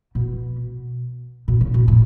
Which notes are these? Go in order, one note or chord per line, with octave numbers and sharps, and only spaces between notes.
B2
B2
C#3
B2
A2